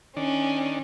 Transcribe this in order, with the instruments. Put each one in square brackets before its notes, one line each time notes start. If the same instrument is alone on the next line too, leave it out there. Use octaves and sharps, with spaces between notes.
[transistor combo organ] D#3 D4 [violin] C#4